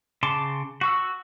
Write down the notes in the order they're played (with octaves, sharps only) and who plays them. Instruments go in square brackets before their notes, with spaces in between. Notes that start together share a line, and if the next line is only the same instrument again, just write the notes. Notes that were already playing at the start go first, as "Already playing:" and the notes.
[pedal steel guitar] C#3 A5 C6 D6
F#4 C#6 E6